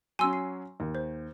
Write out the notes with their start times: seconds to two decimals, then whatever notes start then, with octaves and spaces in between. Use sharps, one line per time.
0.19 F#3 C#4 G#5 C6 E6
0.33 C7
0.80 D#2
0.95 C5